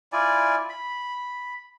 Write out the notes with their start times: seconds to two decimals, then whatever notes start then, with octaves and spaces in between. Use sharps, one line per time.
0.13 E4 F4 D5 G#5
0.69 B5